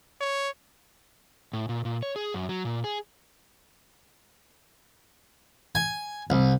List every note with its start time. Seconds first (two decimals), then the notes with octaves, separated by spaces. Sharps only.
0.21 C#5
1.53 A2
1.69 A#2
1.85 A#2
2.03 C#5
2.16 G#4
2.34 F#2
2.49 F#3
2.65 A#2
2.84 G#4
5.75 G#5
6.30 C2